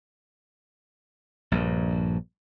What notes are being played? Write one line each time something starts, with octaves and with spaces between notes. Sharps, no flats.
A#1 G2